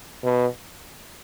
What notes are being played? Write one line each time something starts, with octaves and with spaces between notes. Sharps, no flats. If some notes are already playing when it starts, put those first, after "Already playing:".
B2